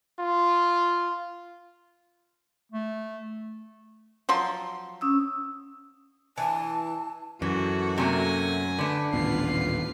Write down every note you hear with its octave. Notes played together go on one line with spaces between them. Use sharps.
F4
A3
F3 F#3 C6
C#4 D#6 E6
E3 A5
F#2 E3 F#4 A4
C3 A3 A#3 G#5 A#6
D3 A3 B4
D#1 A1 B3 F4 B4 C7